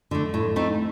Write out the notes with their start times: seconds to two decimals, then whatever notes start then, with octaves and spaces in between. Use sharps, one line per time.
0.11 D3 A3
0.34 A2
0.56 A3 C4 D#4